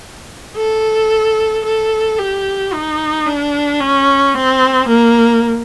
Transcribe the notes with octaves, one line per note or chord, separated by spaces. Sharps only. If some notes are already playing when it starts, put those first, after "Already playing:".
A4
A4
G4
D#4
D4
C#4
C4
A#3